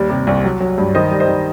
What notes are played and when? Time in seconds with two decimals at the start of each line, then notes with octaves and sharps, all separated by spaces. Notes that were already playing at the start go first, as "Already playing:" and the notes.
Already playing: D#2 G3
0.10 C3
0.27 C2
0.44 F#3
0.60 F#3
0.78 G2
0.95 D#3 C5 D#5
1.11 G3
1.20 C5 D#5
1.28 D#3